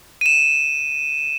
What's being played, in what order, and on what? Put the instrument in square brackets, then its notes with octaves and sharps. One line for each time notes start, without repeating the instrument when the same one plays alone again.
[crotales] D#7 E7